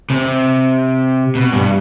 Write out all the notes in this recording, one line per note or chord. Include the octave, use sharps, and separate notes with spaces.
C3
B2
G2